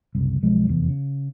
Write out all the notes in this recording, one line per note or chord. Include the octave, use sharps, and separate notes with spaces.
F#1 C2
B1 F3 G#3
F1 E2
C#3